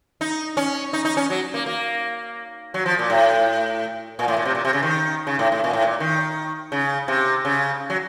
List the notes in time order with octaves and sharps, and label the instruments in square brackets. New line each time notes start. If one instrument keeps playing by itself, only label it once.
[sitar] D#4
C#4
D#4
D#4
C#4
F#3
A#3
A#3
F#3
F3
A#2
A2
A#2
A2
A#2
C3
A#2
C3
C#3
D#3
C#3
A2
A2
A#2
A2
A#2
D#3
C#3
C3
C#3
F#3